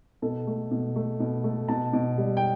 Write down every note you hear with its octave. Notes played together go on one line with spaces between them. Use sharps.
B2 A4
A3
B2
A3
B2
A3
B2 A5
B2
G3
G5